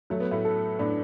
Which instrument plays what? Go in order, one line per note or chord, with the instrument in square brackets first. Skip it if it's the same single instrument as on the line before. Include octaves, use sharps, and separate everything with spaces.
[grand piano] F#3 [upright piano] A3
[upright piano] B3
A2 A3
[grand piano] A4
[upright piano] A2 A3 [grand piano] D4